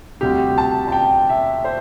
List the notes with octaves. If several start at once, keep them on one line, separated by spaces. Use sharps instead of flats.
D2 C3 G3 G4
A5
A5
G5
E5
C5